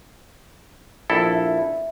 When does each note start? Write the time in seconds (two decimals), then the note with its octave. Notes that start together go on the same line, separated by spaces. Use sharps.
1.10 A#1 E4 A4
1.35 E5